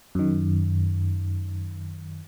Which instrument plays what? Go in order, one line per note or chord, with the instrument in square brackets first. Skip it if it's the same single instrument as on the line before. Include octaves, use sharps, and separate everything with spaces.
[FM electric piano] F#2 D#3